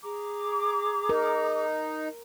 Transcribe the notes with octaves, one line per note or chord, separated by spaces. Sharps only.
G#4 A#5 D6
D#4 A#4